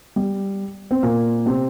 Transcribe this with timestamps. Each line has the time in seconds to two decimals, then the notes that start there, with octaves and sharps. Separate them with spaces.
0.16 G3
0.91 C4
1.03 A#2 A#3
1.46 C3 C4